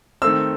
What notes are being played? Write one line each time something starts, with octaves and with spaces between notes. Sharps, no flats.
D#3 A3 C4 E6